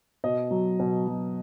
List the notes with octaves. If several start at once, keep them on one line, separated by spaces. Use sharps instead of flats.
B2 D#5
F#3
B2
F#3